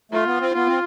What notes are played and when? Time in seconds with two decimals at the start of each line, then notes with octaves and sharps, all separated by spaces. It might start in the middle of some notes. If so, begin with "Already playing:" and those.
0.12 A3 F4
0.26 B3
0.40 C4
0.54 B3 F4
0.67 C4